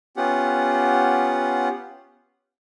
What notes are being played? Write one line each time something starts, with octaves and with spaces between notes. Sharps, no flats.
B3 C#4 F4 G4 F#5